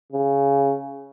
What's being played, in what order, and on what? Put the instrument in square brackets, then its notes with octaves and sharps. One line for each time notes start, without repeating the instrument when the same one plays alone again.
[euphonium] C#3